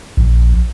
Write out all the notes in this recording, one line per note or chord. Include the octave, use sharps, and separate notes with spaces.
A#1